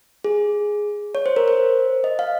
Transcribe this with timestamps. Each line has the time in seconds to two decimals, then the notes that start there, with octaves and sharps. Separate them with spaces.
0.24 G#4
1.15 C#5
1.26 C5
1.36 A#4
1.48 C5
2.04 D#5
2.19 F5